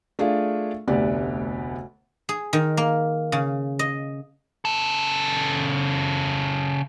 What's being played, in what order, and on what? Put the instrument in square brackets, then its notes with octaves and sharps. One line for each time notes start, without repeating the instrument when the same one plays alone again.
[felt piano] A3 D4 F4 G#4 F5
F1 D2 B3 G4 D5
[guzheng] G#4
D#3
A#3
C#3
D#5
[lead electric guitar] C#3 A4